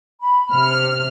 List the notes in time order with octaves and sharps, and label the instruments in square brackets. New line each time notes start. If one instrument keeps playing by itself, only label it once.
[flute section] B5
[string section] C3 F6